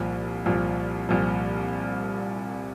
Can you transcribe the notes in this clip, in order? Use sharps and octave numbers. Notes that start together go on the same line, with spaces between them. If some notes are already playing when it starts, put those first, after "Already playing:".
Already playing: C2 A#2 F3
C2 A#2 F3
C2 A#2 F3